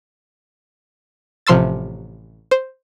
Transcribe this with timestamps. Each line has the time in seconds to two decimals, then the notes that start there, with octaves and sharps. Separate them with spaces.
1.47 A1 C3 F3 C6 E6 A6
2.51 C5